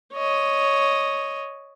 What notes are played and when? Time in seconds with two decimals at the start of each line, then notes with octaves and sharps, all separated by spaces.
0.14 C#5 D#5